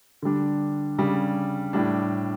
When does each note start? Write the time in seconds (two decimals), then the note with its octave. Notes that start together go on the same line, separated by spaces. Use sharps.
0.22 D3 G3 D4
0.98 C#3 G3 D4
1.73 A2 G3 D4